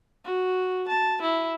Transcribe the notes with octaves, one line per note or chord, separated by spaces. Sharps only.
F#4
A5
E4